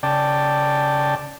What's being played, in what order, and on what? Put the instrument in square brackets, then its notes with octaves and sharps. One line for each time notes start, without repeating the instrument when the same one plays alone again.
[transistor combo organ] C#3 D5 G5 A5